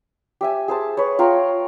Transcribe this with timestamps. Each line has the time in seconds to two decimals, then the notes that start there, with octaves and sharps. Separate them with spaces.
0.41 G4 E5 G#5
0.68 G#4 C5 A5
0.97 B4 C#5
1.19 F4 G5 A#5